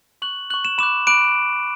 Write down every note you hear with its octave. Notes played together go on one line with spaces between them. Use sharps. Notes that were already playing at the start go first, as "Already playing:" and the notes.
C#6 F#6 F#7
C#6 F#6 F#7
E7
B5 D6 F#6 E7
B5 D6 F#6 D7